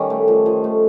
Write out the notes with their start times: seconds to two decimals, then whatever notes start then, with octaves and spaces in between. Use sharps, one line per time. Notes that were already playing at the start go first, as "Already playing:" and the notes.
Already playing: D#3 G3 C#4 C#5
0.10 A3
0.28 F3
0.46 F3
0.64 A3